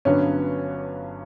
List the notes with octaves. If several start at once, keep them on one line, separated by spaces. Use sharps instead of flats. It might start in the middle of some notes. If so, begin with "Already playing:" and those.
G1 G2 D3 F#3 B3 C#4